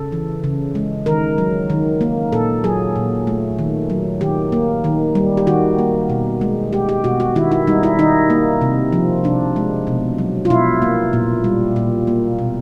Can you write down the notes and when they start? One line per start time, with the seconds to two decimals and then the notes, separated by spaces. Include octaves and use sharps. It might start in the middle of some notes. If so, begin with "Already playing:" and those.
Already playing: C#3 A4
0.12 E3
0.44 C#3
0.75 G#3
1.06 D#3 A#4
1.38 F#3
1.70 D#3
2.01 A#3
2.32 A#2 A4
2.64 F#3 G#4
2.96 A#2
3.27 A3
3.59 D#3
3.90 F#3
4.21 D#3 G4
4.52 A#3
4.84 D#3
5.15 G3
5.37 G4
5.47 D#3 F#4
5.79 A#3
6.10 B2
6.41 G#3
6.73 G#3 G4
6.89 G4
7.04 B2 F#4
7.20 F#4
7.36 D#3 E4
7.51 E4
7.67 G3 D#4
7.83 E4
7.99 D#3 D#4
8.30 A#3
8.61 C3
8.93 F3
9.24 C3 D4
9.56 G#3
9.87 B2
10.18 F#3
10.45 F4
10.50 B2 E4
10.82 A#3
11.13 A#2
11.44 G3
11.76 A#2
12.07 A#3
12.39 B2